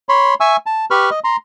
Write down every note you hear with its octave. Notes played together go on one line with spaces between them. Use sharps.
C#5 B5 C6
E5 G#5 C#6 E6
A5
G4 B4 B5 C#6 F6
D#5
A#5 C6